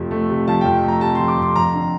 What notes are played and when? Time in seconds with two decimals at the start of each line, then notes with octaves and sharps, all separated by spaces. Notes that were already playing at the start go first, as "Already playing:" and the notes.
Already playing: F2 C3 F3 A3
0.11 A3
0.29 C3
0.48 F3 A5
0.61 F2 G5
0.83 A3 A#5
1.01 C3 A5
1.15 F3 C6
1.28 D6
1.38 F2 C6
1.56 F2 A#5
1.74 D3